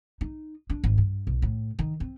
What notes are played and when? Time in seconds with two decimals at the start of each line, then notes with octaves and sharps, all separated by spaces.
0.21 D#4
0.70 D4
0.84 G#1
0.98 G2
1.27 B1
1.42 A2
1.79 D#3
2.00 C4